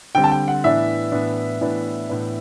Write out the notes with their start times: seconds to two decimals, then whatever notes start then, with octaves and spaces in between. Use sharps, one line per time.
0.15 D3 G3 C4 G5
0.24 A5
0.32 G5
0.48 F#5
0.64 A2 E3 B3 D4 E5
1.12 A2 E3 B3 D4
1.61 A2 E3 B3 D4
2.09 A2 E3 B3 D4